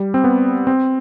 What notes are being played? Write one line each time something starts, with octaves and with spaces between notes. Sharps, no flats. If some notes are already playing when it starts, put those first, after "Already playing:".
Already playing: G3
C4
B3
C4